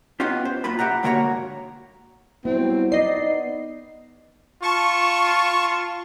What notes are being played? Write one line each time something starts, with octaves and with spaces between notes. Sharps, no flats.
B3 C#4 D#4 F4 G4
C5
F#2 A#3 F4 B5
G4 E5 F#5 A#5
G#2 D3 A#3 F#4 C#5 A#5
F#3 G3 B3 C4 E4
B3 D#4 D5 D#5 C7
F4 A5 C#6